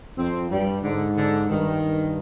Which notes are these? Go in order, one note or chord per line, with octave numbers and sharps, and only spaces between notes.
F2 C4
G2 G3
G#2 D3
D3
G2 D#3
G2